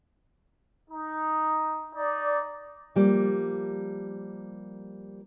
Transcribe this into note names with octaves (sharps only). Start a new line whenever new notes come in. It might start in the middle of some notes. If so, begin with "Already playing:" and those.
D#4
D#4 D5
F3 G3 A#3